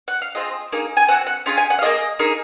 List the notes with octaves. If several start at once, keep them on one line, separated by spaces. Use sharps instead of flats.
F#5
F5
C4 F4 G#4 D#5
A#3 D#4 G#4
G#5
C4 F#4 F#5
F#5
C#4 F4 G#4 G#5
G#5
F#5
F5
A#3 F4 G#4 D#5
A#3 D#4 G#4